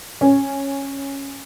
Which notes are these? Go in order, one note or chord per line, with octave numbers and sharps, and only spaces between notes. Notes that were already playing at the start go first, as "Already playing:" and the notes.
C#4